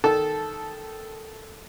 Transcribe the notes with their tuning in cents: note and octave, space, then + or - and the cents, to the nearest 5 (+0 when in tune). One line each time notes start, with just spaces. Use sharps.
D#3 +0 A4 -5 A5 -15